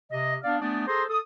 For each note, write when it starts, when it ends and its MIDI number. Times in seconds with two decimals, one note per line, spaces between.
0.12 0.36 48
0.12 0.36 75
0.44 0.58 59
0.44 0.58 62
0.44 0.58 74
0.44 0.58 77
0.61 0.84 57
0.61 0.84 59
0.61 0.84 62
0.61 0.84 68
0.61 0.84 74
0.61 0.84 81
0.87 1.04 68
0.87 1.04 69
0.87 1.04 72
0.87 1.04 82
0.87 1.04 84
1.09 1.19 69
1.09 1.19 87